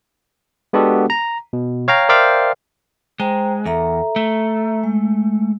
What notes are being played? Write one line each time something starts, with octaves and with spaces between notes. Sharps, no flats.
G#3 B3 D4 F#4 G4 A4
A#5
B2
C#5 F5 G5 A#5
A#4 C5 D5 E5 F5 G5
G#3 C5 G5 A#5
E2 A4 E5 A#5
A3
G#3